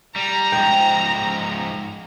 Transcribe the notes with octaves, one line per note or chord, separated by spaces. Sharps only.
G3 A#5
G#2 F3 G5